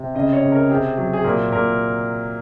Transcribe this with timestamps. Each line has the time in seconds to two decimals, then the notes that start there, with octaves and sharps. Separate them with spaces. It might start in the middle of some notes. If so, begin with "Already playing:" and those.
Already playing: C3
0.15 C#3 D#5
0.33 C#5
0.42 C#3
0.52 A#4
0.69 C3 G#4
0.98 F#3
1.13 G#4
1.24 A#2 A#4
1.52 A#2 A#4